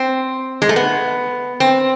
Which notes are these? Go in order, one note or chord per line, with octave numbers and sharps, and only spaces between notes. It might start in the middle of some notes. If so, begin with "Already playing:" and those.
Already playing: C4
G#3
A3
B3
C4